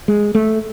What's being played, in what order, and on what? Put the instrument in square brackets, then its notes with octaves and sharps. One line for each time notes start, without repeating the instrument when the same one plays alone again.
[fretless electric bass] G#3
A3